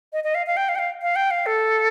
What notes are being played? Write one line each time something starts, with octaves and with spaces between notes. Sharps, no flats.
D#5
D#5
F5
F5
G5
F5
G5
F5
F5
G5
F5
A4